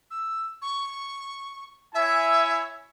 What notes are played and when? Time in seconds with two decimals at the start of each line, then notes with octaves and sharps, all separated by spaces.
0.11 E6
0.62 C#6
1.95 E4 C#5 E5 G#5